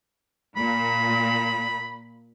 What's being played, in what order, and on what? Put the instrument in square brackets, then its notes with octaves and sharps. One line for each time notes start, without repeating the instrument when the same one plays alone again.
[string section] A#2 [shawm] B5